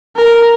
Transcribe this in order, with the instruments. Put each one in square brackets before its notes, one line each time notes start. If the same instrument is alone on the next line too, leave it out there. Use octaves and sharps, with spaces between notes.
[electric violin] A#4